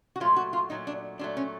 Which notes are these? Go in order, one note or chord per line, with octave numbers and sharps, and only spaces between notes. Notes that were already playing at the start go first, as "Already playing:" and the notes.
F#4
A#2 F#3 A3 F4
F#4
F4
A#2 F#3 A3 D#4
D4
A#2 F#3 A3 D4
C#4